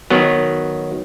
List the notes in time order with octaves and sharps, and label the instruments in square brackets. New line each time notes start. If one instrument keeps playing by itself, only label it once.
[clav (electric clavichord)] D#3 F#3 B3